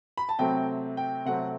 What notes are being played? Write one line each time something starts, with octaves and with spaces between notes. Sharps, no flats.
B5
A5
C3 F#3 A3 C4 G5
G5
C3 F#3 A3 C4 F#5